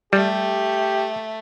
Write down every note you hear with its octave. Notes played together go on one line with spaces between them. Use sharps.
G3 A3 G4